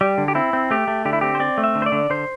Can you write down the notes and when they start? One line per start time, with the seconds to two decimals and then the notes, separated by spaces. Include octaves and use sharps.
0.01 G3 G4
0.18 D3
0.28 G4
0.35 C4 E4
0.53 C4
0.71 A3 G4
0.88 A3
1.05 D3 G4
1.13 E4
1.21 C4 G4
1.35 C5
1.40 C4 D5
1.58 A3
1.64 E5
1.75 D3
1.82 C5
1.86 D5
1.92 D3
2.10 D3 C5